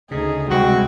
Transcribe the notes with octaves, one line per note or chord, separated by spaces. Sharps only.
D2 C#3 D#4 G#4
C2 G#3 C4 F#4